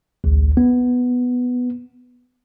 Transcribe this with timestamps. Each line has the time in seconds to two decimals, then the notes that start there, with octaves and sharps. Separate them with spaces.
0.24 A1 D2
0.57 B3